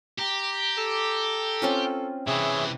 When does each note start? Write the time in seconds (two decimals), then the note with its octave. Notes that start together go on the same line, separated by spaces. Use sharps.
0.19 G4 A#5
0.78 A4
1.62 C4 C#4 F4
2.27 C3 E3 G#4 C#5 E5